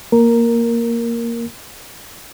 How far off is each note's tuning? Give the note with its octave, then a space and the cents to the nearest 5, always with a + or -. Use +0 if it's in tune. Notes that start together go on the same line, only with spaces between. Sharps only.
A#3 +0 A#4 +0